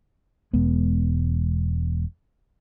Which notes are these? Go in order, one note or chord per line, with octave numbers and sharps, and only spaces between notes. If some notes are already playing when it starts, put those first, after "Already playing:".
E1 G#3 B3